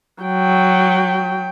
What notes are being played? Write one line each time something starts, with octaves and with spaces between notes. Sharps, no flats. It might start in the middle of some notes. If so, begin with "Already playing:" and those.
F#3 G5